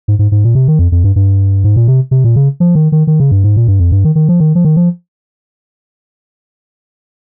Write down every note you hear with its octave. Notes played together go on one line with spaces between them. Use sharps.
G#2
G#2
G#2
A#2
C3
D#3
F2
F2
G2
G2
G#2
A#2
C3
C3
A#2
C#3
F3
D#3
D#3
D#3
C#3
G2
G#2
A#2
G2
F2
G2
D#3
D#3
F3
D#3
F3
D#3
F3